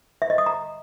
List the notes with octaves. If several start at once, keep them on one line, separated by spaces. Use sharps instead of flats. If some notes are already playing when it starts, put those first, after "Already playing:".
E5
D#5
D#6
A#5